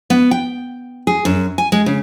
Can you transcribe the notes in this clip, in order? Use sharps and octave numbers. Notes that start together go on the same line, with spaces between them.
B3
G5
G#4
F#2
G#5
G#3
C#3